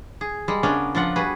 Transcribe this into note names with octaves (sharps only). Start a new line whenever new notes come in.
G#4
G3 G#3
C#3 B3 C#4 D4 A#4 D5
F3 D4 F4 F#5
G3 F#4 G#4 B4